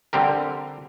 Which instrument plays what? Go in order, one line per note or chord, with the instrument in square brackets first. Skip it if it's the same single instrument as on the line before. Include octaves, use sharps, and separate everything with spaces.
[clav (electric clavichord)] D3 G3 C4 G4 A#4